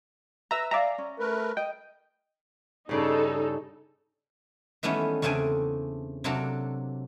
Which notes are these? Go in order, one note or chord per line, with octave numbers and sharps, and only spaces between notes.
B4 E5 A#5 E6
D5 E5 F5 G#5 A#5
C#4
A3 A#4 B4
D#5 G5
G2 C#3 D#4 A4 D5
D#3 E3 G3 A3 B3 C#4
E2 C#3 A3 C4 D4 G#5
C3 F#3 A#3 D4 F#4 A4